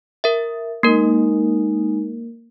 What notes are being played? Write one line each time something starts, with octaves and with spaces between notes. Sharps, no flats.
A#4 E5
G#3 A#3 D#4 A#4